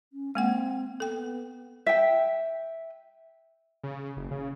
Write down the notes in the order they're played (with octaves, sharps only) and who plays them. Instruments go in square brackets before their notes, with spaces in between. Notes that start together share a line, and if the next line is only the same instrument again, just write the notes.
[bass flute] C#4
[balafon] G#3 A#3 F#5 [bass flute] C4
[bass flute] B3 [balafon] A4 G5
[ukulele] E5 G5
[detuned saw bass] C#3
F#1
C#3